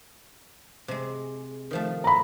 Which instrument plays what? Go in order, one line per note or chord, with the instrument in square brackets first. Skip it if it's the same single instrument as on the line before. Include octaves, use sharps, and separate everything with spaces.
[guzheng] C3 G#3
D#3 F3 A3
[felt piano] A#5 B5